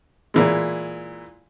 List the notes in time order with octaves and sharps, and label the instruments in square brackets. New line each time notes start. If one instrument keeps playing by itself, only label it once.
[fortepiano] A#2 E3 G#3